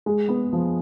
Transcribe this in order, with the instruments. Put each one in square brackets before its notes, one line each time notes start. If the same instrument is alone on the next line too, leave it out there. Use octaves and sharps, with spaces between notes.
[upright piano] G#3
B3
F3